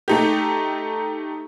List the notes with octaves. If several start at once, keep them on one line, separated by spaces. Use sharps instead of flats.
A3 D#4 G4